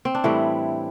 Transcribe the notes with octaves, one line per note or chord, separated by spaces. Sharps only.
C4
D4
A2 E3 G3 E4